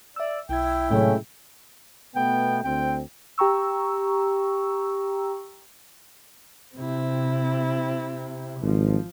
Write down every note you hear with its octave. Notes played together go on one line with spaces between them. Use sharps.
D5 E5 E6
B1 E4 G5 G#6
A2 C3 F#3 G#3 A3 C#4 G5
B2 A3 B3 G5
D2 C4 G5
G4 G5 A#5 C#6 E6
C3 C4 E4
G#1 F3